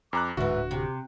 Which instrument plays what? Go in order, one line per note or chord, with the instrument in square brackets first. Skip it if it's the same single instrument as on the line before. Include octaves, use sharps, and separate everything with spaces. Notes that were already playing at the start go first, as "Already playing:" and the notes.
[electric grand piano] F2 A#5 F#6 [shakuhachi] D6
[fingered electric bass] D1 D3 [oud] G#2 E3 [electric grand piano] F#4 [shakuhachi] E5
[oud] C3 [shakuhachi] G4